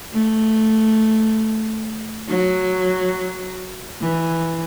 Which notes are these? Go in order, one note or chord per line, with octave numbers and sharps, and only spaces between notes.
A3
F#3
E3